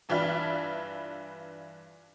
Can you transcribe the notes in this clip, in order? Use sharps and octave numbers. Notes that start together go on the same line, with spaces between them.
G2 E3 D4 F4 E5 F6